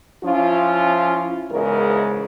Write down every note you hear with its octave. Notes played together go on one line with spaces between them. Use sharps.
F3 C#4 E4 F4
E2 G#2 C#3 G#3 A#4